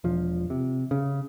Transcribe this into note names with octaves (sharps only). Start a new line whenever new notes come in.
E1 F3
C3
C#3